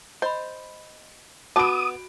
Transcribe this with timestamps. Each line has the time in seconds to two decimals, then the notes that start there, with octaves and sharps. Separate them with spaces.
0.22 C5 D#5 B5
1.56 B3 F#4 A5 B5 D6 D#6 D7